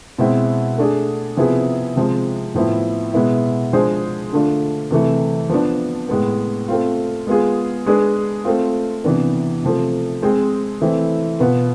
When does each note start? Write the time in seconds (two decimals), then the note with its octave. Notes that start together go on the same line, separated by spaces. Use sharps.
0.18 B2 G#3 C4 E4
0.78 A3 D4 G#4
1.37 C3 F3 B3 E4 G#4
1.96 C3 F3 G#3
2.54 A2 F3 B3 E4
3.13 B2 G#3 B3 E4
3.73 F3 G#3 D4 G#4 C5
4.33 D3 A3 D4 F4
4.91 C3 E3 A3 E4
5.49 F3 B3 D4
6.09 A2 G#3 B3
6.68 A3 C4 F4
7.27 G#3 B3 F4 G#4
7.86 G#3 D4 G#4 B4
8.45 A3 C4 F4
9.04 C3 E3 B3 D4
9.63 C3 F3 A3
10.22 G#3 C4 G#4 C5
10.81 E3 A3 C4 E4
11.40 B2 B3 F4 B4